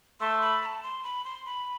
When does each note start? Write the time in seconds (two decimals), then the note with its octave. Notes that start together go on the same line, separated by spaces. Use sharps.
0.20 A3 C6
0.41 B5
0.62 B5
0.66 A5
0.83 C6
1.04 B5
1.25 C6
1.45 B5